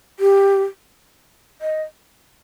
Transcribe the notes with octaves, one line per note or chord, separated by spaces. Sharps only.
G4
D#5